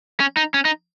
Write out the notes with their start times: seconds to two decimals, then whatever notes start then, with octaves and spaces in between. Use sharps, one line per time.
0.20 C#4
0.37 D#4
0.54 C#4
0.65 D#4